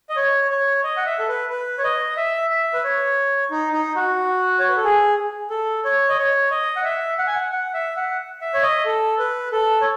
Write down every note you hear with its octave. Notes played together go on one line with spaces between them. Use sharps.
D#5
C#5
C#5
D#5
F#5
E5
A4
B4
B4
C#5
D#5
E5
E5
B4
C#5
D#4
D#4
F#4
C#5
B4
A4
G#4
A4
C#5
D#5
C#5
D#5
F#5
E5
F#5
G#5
F#5
F#5
E5
F#5
E5
C#5
D#5
A4
B4
A4
C#5